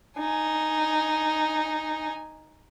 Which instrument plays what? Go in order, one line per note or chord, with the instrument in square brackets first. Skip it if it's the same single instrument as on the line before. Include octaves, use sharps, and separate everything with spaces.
[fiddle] D#4 G#5